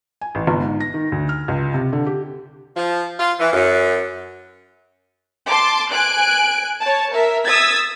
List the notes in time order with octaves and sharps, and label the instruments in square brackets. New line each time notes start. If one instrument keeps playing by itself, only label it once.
[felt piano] G#5
A1
G1
G#2
A#6
D#3
D2
F6
C#2
C3
D3
G4
[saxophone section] F3
F4
E3
F#2
[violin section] A5 C6 D6
G#5 F#6 D7
C#5 A5
A#4 E5
D#6 E6 G#6 A6 B6